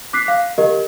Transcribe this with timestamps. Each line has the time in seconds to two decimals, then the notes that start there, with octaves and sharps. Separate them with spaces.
0.13 D6 F#6 B6 C7
0.28 F5
0.58 G4 A#4 D#5